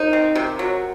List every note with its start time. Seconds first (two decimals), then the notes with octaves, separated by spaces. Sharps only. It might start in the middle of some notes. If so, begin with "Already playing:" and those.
Already playing: D#4 A#4 C5
0.13 C4
0.35 C3
0.59 F#3